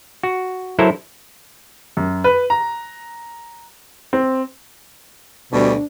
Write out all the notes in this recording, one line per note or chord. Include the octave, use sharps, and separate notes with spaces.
F#4
F#3 E4 A4 A#4 C5
F#2
B4
A#5
C4
D2 B2 G3 D4